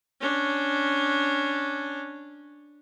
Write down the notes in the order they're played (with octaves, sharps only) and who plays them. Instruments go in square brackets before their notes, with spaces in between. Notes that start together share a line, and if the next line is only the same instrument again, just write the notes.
[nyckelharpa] C#4 D4